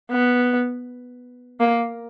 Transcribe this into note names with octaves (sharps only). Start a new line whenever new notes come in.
B3
A#3